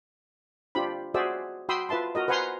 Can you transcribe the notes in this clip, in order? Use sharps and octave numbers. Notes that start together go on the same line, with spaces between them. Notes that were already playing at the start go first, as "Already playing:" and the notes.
D4 F4 G4 C5 B5
F#4 G#4 C5 D5 E5 E6
F#4 G5 B5 C6 D#6 E6
F4 B4 E5 A5 C6
F#4 A#4 D#5
B4 C5 F#5 G#5 A#5 C6